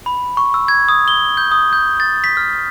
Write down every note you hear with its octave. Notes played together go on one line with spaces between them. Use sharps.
B5
C#6
E6
G#6
D#6
G7
G6
D#6
G6
A6
B6
F6